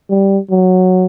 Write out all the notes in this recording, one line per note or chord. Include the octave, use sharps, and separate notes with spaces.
G3
F#3